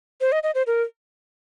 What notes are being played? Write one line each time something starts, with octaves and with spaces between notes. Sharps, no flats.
C5
D#5
D#5
C5
A#4